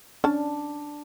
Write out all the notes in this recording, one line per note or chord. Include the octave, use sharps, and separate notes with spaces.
C#4 D4 A5